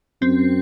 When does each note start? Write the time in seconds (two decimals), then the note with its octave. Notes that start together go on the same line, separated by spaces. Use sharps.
0.22 F#2 C4